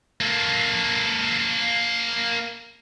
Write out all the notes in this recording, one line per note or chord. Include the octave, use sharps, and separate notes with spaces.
A#3 A4